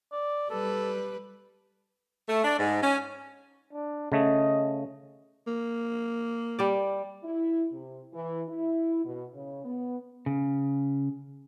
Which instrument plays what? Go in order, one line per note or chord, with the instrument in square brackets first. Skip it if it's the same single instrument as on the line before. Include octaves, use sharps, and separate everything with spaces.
[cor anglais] D5
[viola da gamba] G3 B4 [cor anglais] A4
[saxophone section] A3
D4
G#2
C#4
[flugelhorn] D4
[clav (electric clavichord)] C#3 A3 [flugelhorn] D#5
[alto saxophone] A#3
[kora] G3 D5
[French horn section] E4
C3
E3
E4
B2
C#3
B3
[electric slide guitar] C#3